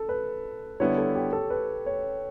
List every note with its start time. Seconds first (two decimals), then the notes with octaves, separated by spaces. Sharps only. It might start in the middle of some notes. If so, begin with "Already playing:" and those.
Already playing: A4
0.09 B4
0.80 D3 G3 B3 E4 C#5
0.98 A4
1.15 G4
1.33 A4
1.50 B4
1.86 C#5